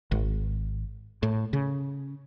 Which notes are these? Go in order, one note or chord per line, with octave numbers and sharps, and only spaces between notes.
G#1
A2
C#3